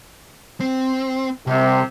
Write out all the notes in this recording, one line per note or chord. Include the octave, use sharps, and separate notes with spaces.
C4
C2 C3